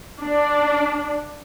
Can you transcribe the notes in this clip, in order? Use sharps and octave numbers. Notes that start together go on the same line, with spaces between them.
D4